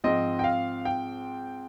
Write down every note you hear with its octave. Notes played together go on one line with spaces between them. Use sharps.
G#2 F3 C4 D#5
G5
F5
G5